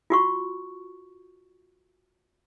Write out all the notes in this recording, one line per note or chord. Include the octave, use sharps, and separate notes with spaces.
F4 F#4 C#6